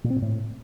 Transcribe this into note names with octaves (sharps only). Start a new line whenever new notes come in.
A#2
C4
A#2
A2